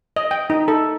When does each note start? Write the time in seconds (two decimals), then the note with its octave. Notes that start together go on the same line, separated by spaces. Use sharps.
0.16 D#5
0.31 G5
0.50 D#4
0.68 A4